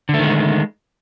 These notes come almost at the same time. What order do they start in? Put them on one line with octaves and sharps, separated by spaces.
D3 A3 D#3 G#3